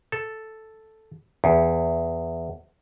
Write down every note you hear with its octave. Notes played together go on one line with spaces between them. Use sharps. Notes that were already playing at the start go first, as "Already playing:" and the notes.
A4
E2